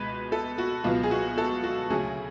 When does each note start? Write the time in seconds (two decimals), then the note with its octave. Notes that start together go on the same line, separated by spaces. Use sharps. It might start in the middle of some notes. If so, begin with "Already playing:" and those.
Already playing: C#2 B2 G#3 B3 B4
0.32 A4
0.58 F#4
0.84 C#2 B2 F#3 B3 F4
1.03 G#4
1.11 F#4
1.38 A4
1.64 F#4
1.90 D2 C#3 F#3 C#4 G#4